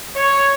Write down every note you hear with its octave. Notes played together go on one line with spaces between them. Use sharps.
C#5